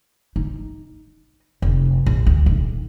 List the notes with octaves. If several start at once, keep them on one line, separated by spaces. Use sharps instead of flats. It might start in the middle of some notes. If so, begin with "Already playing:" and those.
D#4
F1
A#1
D2
D#1